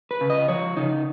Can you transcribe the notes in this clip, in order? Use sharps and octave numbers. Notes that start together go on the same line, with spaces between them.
B4
C#3
D#5
F3 C#5
C#3 D#4